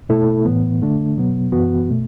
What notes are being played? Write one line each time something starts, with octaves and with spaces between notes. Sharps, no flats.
B2 A3 E4 A4
A2 E3 B3
D3 A3 D4
B2 F#3 B3
F#2 E3 B3 F#4
B2 A3